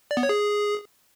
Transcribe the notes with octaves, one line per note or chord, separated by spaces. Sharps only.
D5
B3
C#5
G#4